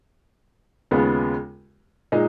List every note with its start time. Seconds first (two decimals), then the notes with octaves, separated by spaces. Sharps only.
0.91 D#2 C#3 G#3 B3 F4
2.12 A#2 G#3 D#4